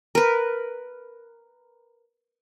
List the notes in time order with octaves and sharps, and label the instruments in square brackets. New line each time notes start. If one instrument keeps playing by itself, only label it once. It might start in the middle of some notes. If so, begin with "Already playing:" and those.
[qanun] A#4 B4